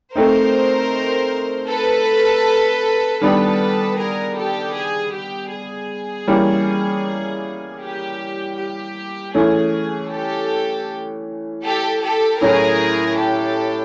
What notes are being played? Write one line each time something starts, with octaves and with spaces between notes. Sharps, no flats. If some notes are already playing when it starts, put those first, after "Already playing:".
A3 C4 D#4 A#4 C5
A4 B4
D#3 G3 B3 D4 A4 B4
G#4 A#4
G4 A4
G#4
G4
G#4
E3 G3 A#3 C#4
G4
G4
E3 A3 C#4 G#4
G4 A4
G4 A4
G4 A4
A2 F#3 A3 C#4 E4 G#4 A#4
G4 A4